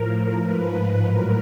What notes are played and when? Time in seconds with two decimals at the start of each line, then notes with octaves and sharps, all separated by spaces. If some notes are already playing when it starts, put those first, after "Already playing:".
Already playing: A2 F3 A#4
0.40 G#2 F3 B4
0.71 B4
1.02 A2 F#3 A#4